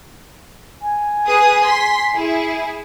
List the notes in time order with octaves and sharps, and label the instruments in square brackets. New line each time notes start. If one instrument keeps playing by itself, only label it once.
[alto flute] G#5
[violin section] G#4 B4 D#6
C6 B6
E4 G#4